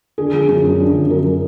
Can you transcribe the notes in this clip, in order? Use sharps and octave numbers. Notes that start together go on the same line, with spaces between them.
D3 G#4
F3
F#2
F#2
D3
F3
F#2 A#4